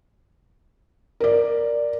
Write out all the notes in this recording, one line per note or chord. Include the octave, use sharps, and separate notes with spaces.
A#4 D5